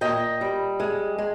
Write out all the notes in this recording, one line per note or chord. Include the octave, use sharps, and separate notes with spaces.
A#2 D#5 G5
G3
G#3
G#3